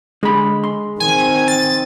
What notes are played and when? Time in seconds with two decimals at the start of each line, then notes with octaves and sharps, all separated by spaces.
0.23 D3 G#3 B5
0.64 C6
1.00 D#3 C4 G#5
1.48 A6